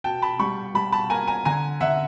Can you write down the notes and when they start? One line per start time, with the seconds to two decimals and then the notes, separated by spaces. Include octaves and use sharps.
0.04 B2 G5 A5
0.22 A5 B5
0.39 G3 B5 C#6
0.75 G3 A5 B5
0.92 A5 B5
1.10 A#3 G#5 A#5
1.27 G#5 A#5
1.45 D3 G#5 A#5
1.80 D3 E5 F#5